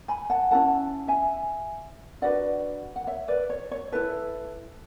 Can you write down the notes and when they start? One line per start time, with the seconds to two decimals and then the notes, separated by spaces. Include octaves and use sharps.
0.08 G#5 B5
0.30 F#5 A5
0.51 C#4 E4 A4 F#5 A5
1.08 E5 G#5
2.22 D4 F#4 B4 D5 F#5
2.96 F#5
3.07 C#5 E5
3.28 B4 D5
3.50 C#5
3.71 C#5
3.92 E4 A4 B4